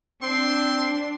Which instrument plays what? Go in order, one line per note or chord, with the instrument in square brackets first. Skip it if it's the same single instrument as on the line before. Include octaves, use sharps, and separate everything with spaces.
[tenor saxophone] C4 [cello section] D4 [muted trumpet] C6